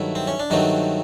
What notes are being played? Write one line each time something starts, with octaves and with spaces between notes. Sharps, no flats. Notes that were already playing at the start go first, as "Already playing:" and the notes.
Already playing: G2 D#3 F#3 A3 E4
C4
C#4
D4
G2 D#3 F#3 A3 C4 D#4